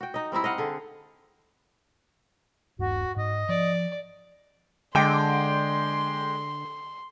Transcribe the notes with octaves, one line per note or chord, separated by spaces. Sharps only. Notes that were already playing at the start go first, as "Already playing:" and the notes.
F#4 G5
D#4 D#5
G3 C4 D#4 E4
D#5 F5 F#5
D3 G#4
D#1 G2 F#4
G#2 D#5
F3 D5
D3 G#3 G5 C6 D6